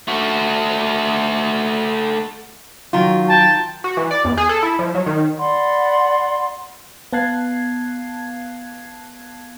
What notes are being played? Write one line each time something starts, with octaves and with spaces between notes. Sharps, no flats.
A3 F#4
D#3 F#3 F4
G5 A5
F#4
E3
D5
E2
G#4
A4
E4
F3
F#3
D#3
D5 F#5 B5 C6
B3 F5 A5 F#6 G#6 C7